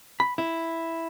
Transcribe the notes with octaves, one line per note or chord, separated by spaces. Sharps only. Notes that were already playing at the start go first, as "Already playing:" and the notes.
B5
E4